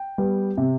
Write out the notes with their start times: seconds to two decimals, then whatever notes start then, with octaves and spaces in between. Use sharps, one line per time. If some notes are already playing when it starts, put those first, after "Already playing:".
Already playing: G5
0.18 G3 B3
0.57 C3